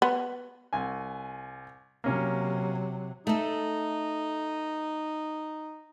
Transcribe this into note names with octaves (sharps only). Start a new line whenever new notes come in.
B3
C2 G#5
C3 F#3 A#3 C#4
A3 D#4 A4